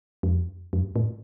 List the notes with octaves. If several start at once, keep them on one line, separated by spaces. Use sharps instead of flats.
F2
F2
F#2
A2